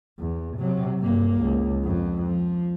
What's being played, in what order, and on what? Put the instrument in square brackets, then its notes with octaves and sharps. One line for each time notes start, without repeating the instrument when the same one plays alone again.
[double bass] E2
C3 F#3
G2 A#3
C#2
F2
F3